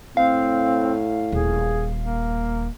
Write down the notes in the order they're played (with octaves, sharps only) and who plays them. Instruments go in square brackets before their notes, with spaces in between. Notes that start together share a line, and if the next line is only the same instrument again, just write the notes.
[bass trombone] A2 [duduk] C4 [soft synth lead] F5
[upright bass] D#1 [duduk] G#4
[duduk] A#3